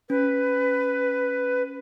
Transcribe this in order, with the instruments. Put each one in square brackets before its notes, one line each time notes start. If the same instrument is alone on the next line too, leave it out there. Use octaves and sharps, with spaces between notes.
[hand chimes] C#4 [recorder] B4